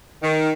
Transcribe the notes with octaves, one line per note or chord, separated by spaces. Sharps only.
D#3